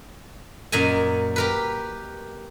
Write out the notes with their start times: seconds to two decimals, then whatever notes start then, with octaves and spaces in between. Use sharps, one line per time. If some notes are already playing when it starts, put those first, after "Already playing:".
0.72 F#2 A#2 D#5 G#5
1.36 G4 A#4 B4